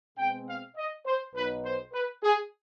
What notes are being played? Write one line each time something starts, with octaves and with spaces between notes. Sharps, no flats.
B2 G#3 C4 G5
F5
D#5
C5
B1 B2 B3 D#4 B4
C5
B4
G#4